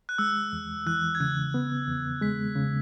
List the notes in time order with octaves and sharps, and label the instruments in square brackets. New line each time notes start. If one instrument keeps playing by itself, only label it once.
[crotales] F#6
[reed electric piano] G#3 [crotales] E6
[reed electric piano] E2
[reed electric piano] E3 [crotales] F#6
[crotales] G#6
[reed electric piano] C#3 [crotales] F#6
[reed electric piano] B3
E2
[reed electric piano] G#3 [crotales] B6
[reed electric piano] C#3